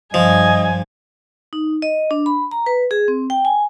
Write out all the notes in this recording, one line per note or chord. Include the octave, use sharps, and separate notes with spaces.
G2 F3 D#5 G#5
D#4
D#5
D4
B5
A#5
B4
G#4
C4
G5
G#5